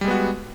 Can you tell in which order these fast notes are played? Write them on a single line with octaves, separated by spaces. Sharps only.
G3 G#3 B3 F#4